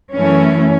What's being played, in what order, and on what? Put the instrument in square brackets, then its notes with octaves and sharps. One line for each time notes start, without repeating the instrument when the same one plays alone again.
[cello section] F#2 E3 A3 C#4